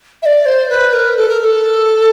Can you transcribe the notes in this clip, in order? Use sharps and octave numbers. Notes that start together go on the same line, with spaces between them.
E5
D5
C5
B4
A#4
A4
A#4
A#4
A4